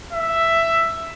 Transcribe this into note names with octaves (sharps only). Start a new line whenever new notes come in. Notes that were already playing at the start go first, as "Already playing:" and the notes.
E5